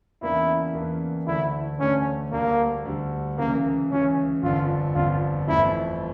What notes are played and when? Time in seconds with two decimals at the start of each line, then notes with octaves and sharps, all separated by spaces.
0.22 E2 C#3 E3 A#3 D4 E4
0.75 E2 C#3 E3 A#3 D4
1.27 D2 D3 A3 D4 E4
1.80 D2 D3 A3 C#4 D4
2.32 D2 D3 G3 A#3
2.85 D2 D3 G3
3.38 C#2 C#3 E3 A#3
3.90 C#2 C#3 E3 C#4
4.42 G1 F2 D3 F4
4.95 G1 F2 D3 F4
5.48 G1 F2 E3 A3 E4